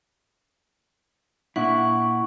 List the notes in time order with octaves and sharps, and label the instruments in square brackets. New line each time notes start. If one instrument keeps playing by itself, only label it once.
[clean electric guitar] A#2 D4 E4 [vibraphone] F#5 C#6